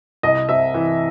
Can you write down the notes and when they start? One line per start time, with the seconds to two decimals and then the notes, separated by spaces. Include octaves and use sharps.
0.23 C2 D#5
0.49 C3 E5
0.74 E3